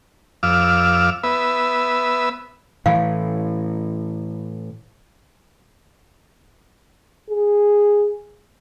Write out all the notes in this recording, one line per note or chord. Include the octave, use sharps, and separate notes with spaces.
F2 F5 D6 E6
B3 B4 E5
A2 E3 F5
G#4